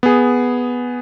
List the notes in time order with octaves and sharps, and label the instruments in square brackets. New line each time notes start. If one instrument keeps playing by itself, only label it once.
[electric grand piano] B3 G#4